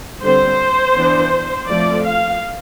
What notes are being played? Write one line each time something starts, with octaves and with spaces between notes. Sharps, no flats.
D3 G3 C4 C5
E3 B3 D4
F3 A3 C4 D5
F5